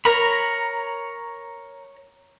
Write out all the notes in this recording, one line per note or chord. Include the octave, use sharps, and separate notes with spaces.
A#4 C#5 A#5 B5